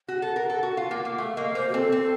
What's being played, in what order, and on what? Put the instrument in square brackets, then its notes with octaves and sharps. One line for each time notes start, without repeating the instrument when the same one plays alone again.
[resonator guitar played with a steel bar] F#4 [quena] F#5
[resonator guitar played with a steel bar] A4
A#4
A4
F#4
F4
A#3
A#3
[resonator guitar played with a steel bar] A3 [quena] F5
[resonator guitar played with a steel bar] A#3 [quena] D#5
[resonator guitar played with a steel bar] A#3 [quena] C5
[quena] F#4
[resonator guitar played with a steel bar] C4 [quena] A4
[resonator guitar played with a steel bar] C4